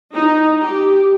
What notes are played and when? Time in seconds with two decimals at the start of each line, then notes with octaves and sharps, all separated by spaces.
0.14 D#4
0.62 G4